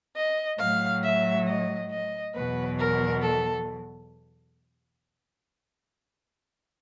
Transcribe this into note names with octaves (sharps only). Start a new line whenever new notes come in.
D#5
A2 F#3 F5
E5
D#5
D#5
E2 B2 F#3 B4
A#4
A4